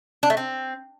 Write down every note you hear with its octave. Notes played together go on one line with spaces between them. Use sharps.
D4
A3
C4